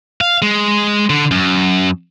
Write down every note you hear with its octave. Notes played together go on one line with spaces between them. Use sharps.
F5
G#3
D3
F#2